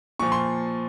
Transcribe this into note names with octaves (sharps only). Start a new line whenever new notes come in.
A#2 F3 C#6
C6